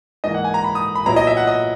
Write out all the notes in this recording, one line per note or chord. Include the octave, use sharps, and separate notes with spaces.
G#2 E3 A#3 D#5
F#5
G#5
A#5
B5
D#6
B5
A#2 F#3 B3 E4 A#5
D#5
E5
F#5
D#5